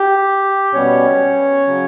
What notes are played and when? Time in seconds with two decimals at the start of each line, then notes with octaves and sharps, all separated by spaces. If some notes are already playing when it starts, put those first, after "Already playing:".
Already playing: G4
0.73 B2 G3 B3 C#4 C#5
1.67 C#3 F#3